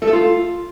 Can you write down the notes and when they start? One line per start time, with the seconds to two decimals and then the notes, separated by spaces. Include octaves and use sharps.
0.02 A3
0.07 A4
0.13 F4